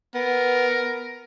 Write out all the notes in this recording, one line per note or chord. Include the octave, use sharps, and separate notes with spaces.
B3 A#4